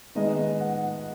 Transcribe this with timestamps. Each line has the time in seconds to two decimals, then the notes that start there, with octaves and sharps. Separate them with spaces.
0.15 D#3 G#3 B3 D#5
0.60 F#5